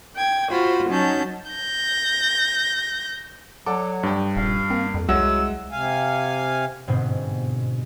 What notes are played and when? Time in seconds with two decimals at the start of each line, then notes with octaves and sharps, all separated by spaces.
0.16 G5 G#6
0.50 F4 F#4 C5 B5
0.89 F#3 C#4 D#4 A5 G6
1.51 G6 A#6
3.66 F#3 A4 D5 F#5 D6
4.03 G2 D4 G4
4.36 D#1 F5
4.70 A#3 C4
4.94 F2
5.09 C2 F#3 G#3 E5 F#5 E6
5.72 C3 F5 G#5
6.87 G1 G#2 B2 C4 B4 C5